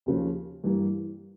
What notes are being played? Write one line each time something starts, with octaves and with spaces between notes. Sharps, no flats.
D#2 C#3 F3
G2 E3 G3 A#3